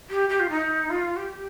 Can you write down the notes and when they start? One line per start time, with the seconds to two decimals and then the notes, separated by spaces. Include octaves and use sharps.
0.10 G4
0.29 G4
0.39 F4
0.49 D#4
0.90 F4
1.16 G4